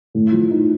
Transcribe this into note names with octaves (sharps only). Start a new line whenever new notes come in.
A2
F3
D#4